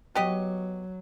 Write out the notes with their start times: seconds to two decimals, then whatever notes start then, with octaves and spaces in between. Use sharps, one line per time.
0.15 F#3 B3 G4 D#5